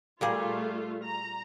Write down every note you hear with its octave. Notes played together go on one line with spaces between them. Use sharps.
A#2 G3 A3 F4 G#4
A#5